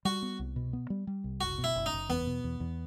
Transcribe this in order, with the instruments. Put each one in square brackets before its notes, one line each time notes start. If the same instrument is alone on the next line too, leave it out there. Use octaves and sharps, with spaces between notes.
[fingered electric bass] G3 [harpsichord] F#4
[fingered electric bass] B3
C2
B2
B3
G3
G3
C2
[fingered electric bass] F#1 [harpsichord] F#4
[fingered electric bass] B2
[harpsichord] E4
[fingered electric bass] F#1
[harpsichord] D#4
[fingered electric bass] F#1
[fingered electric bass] E2 [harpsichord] B3
[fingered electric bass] B2
E2
E2